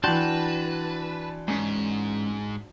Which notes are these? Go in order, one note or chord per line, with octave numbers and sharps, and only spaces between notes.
E3 D4 F#4 B4 G5 A5 C6
G#2 G#3 C#4